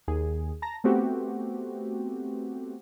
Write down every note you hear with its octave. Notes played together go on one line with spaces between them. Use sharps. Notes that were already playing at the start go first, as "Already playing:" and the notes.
D#2 G#4
A5 A#5 A#6
A3 B3 C4 F#4 G4